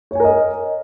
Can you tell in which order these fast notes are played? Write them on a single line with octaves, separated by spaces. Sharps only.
C#5 G#5 A#4 D#5